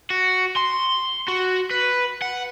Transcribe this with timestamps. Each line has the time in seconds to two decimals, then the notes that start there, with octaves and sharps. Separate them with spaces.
0.10 F#4
0.56 C6
1.28 F#4
1.71 B4
2.22 F#5